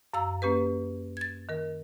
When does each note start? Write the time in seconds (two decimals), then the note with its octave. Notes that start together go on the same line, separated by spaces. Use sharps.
0.13 F#2 F5 A#5 E6
0.42 A#3 C#4 G4 B4
1.17 G#6 A6
1.49 D#3 A#4